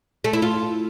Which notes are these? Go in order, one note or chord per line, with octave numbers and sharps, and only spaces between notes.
A3
E4
F4